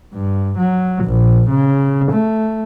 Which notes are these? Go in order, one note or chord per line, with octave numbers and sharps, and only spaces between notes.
G2
F#3
A#1
C#3
A3